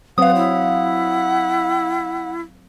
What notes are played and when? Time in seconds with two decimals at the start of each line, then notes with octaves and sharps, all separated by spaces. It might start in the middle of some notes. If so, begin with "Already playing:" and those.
0.18 F#3 C4 B4 C5 F5 F#5 D#6
0.35 E4